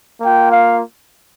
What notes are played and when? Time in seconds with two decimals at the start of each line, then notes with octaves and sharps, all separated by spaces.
0.21 A#3 F4 G5
0.50 F5